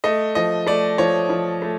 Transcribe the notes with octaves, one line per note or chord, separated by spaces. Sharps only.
A3 D#5
F3 D#5
A3 D5
F3 C#5
F3
A3